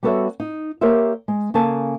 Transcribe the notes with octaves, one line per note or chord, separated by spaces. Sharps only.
G3 B3 F#4 A4 C#5 E5
D#4
A#3 G4 A#4 C5 C#5 E5
G#3
C#3 A#3 A4 G#5 A5